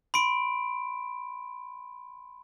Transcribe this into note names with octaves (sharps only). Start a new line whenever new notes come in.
B5 C6 D7